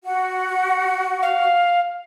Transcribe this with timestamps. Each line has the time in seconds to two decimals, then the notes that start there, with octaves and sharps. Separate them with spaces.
0.04 F#4 F#5
1.22 F5